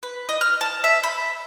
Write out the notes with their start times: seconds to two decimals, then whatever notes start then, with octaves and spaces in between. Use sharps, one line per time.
0.03 B4
0.29 D#5
0.41 F6
0.61 A5
0.84 E5
1.03 B5